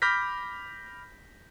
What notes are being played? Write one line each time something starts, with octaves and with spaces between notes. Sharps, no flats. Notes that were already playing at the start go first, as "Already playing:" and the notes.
B5 D6 F6 G6 A#6 B6